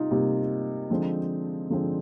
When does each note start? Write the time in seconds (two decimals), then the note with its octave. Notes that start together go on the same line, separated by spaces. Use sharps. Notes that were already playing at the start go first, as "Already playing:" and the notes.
Already playing: C3 G3 D#4 F4
0.11 C3 G3 A#3
0.90 D3 F3 G#3 C4
1.70 D3 F3 G#3 C4